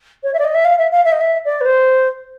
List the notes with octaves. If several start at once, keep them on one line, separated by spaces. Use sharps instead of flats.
C#5
E5
D5
D#5
E5
F5
E5
F5
E5
D#5
E5
D5
B4
C5